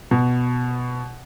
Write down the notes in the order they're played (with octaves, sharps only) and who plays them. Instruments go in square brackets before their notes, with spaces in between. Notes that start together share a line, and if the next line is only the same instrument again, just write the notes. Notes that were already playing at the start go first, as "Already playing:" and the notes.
[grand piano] B2